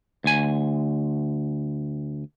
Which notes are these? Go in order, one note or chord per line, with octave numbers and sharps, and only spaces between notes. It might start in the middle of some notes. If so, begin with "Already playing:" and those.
D2 G#5